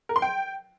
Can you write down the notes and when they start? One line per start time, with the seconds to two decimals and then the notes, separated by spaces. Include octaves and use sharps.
0.09 A#4
0.16 C6
0.22 G5